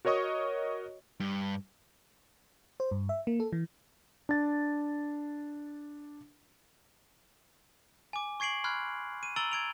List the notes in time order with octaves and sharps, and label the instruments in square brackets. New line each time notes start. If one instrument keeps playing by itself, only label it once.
[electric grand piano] F#4 A#4 C#5 D#5 C#6 D#6
[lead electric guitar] G2
[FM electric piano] C5
G2
E5
A#3
A4
E3
[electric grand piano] D4 A6
[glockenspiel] G#5 D6
C#6 G#6 C7 D7 F#7
B5 C6 F6 F#6 G#6
D#7
A#5 E6 A6 D7 F#7 G7
G#6 D7 F7